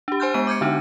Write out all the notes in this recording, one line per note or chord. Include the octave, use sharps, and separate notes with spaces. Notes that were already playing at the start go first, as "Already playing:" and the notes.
D4 G4
C5 G#5 C6 F6 G6
G#3 B3 G#5 D#7
D6 G6 G#6 C#7
D3 D4 D#4